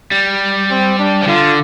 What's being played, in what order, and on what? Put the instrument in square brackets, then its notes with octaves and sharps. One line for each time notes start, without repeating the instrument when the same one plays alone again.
[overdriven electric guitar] G3
[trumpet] C4
D4
[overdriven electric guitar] F3
[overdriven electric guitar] D3 [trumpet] F4